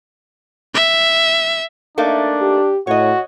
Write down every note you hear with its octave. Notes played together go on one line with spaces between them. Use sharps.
E5
A3 A#3 D4 D#4
G4
A2 F#4 C#5 D#5